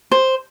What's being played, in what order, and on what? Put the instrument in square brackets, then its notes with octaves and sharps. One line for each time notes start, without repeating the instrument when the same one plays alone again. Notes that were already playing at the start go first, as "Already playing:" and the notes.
[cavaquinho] C5